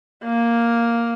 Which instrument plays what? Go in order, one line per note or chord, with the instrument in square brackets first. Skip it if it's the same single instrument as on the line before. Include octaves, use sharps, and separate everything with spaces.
[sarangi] A#3